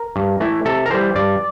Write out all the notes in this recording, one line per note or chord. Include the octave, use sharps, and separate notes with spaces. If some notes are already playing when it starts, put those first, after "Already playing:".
Already playing: A#4
G2
E3 A3 E4
C3 A4
A#4
E3 G3 C5
G2 D5